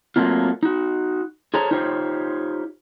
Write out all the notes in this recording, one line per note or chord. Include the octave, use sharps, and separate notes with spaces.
F#3 A3 A#3 C4 F4
D#4 F#4
G#4 A4 C5 C#5 A#5
D#4 F4 G4 C5 C#5